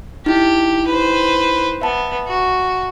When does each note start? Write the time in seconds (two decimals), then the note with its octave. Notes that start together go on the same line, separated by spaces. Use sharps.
0.26 D#4 E4 G4
0.87 B4 C5
1.82 B3 E5 A5
2.27 F#4